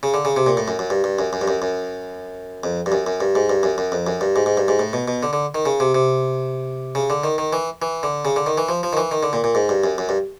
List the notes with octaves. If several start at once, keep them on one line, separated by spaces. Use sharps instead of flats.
C#3
D3
C#3
C3
A#2
A2
F#2
F#2
G2
G2
F#2
F#2
G2
F#2
F#2
F2
G2
F#2
F#2
G2
G#2
G2
F#2
F#2
F2
F#2
G2
G#2
G#2
G2
G#2
A2
B2
B2
D3
D3
D#3
C#3
C3
C3
C#3
D3
D#3
D#3
E3
E3
D3
C#3
D3
D#3
E3
F3
F3
D#3
E3
D#3
D3
A#2
A#2
G#2
G2
F#2
F#2
G2